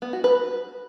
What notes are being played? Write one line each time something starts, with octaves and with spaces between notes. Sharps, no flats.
B3
F#4
B4